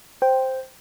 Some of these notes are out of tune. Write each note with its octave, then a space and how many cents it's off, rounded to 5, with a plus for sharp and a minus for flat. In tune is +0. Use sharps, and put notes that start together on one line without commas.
C5 +0 G5 +0